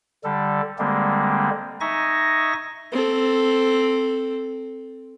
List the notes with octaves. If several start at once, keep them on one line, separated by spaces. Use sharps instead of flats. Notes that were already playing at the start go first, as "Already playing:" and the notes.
D3 G3 A4
D3 G3 G#3 A#3 C4
D#4 D#5 E5 G#5 C#6 A#6
C4 A4